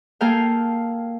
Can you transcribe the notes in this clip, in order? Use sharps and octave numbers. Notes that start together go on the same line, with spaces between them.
A#3 G#4 A4 F5 G5